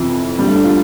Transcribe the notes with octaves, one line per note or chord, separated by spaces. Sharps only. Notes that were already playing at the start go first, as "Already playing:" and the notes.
Already playing: F2 C3 E3 F3
G2 D3 G3
A3
D4
F4